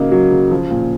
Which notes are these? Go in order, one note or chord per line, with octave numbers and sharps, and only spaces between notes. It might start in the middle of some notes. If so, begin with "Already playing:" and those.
Already playing: C#3 F#3 A#3 D#4
F#3
C#3
F3
A#2